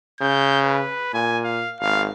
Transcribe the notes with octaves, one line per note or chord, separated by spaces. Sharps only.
C#3 G6
B4
A#2 G#5
F5
G#1 F5